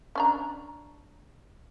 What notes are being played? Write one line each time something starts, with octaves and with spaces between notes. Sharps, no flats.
C#4 D4 A#5